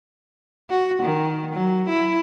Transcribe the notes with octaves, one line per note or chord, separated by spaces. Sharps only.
F#4
D#3
F#3
E4